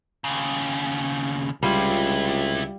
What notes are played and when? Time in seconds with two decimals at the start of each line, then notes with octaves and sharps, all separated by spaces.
0.24 D#2 C#3
1.63 C#2 C3 G3 E4 F4